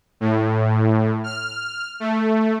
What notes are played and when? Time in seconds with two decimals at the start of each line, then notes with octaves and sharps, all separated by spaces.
0.20 A2
1.24 F6
2.00 A3